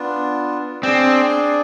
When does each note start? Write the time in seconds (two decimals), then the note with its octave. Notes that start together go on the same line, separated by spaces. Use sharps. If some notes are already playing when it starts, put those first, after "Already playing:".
Already playing: B3 D4 F4
0.82 C4 D4 G#4 D5